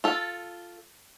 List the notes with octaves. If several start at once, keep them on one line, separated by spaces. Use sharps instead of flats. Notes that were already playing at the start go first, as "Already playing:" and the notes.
F4 A4